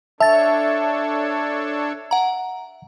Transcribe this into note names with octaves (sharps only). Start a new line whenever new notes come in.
D4 A4 C#5 E5 A5 A6
F#5 A#5